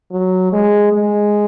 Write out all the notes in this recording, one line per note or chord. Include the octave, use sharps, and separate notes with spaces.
F#3
G#3
G#3